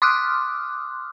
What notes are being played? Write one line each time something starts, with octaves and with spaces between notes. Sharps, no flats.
C6 D6 D#6 F6 F#6